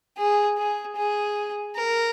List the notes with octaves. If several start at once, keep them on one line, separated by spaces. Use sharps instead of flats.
G#4
G#4
G#4
A#4